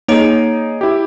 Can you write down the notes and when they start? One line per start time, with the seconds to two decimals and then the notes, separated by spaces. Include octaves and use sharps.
0.08 A#3 D#4 G#4 C#5 D7
0.81 E4 G4